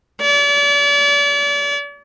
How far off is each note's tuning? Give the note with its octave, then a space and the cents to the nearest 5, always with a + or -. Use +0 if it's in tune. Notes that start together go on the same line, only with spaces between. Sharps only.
D5 -40